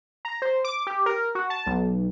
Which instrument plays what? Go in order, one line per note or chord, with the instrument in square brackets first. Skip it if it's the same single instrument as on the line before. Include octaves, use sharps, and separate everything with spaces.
[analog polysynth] A#5
C5
D6
G4
A#4
F#4
A5
B1